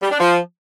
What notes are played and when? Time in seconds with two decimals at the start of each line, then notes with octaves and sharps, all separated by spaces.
0.02 G3
0.11 D4
0.20 F3